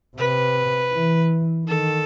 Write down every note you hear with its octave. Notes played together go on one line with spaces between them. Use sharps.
C3 B4
E3
D#3 A4